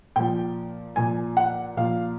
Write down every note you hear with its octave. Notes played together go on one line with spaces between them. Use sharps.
A#2 F3 G5
A#2 F3 G#5
F#5
A#2 F3 F5